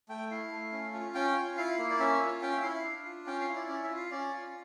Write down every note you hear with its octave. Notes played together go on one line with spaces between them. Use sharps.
A3 G5
E4 F5
A3
C#4
F4
C#4 G5
F4
E4 F5
A#3
D5
C#4 E5
F4
C#4 G5
E5
E4 F5
D4
F4
C#4 G5
F5
E4
D5
C#4 D5
E5
F4
F5
C#4 D5
F4